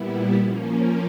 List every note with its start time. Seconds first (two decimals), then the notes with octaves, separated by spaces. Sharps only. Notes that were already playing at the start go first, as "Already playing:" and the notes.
Already playing: A#2 G3 B3 E4
0.34 F3 A#3 C#4